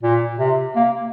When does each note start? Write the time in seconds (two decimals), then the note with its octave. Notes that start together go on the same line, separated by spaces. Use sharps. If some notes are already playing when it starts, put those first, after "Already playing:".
0.03 A#2
0.39 C3
0.76 A#3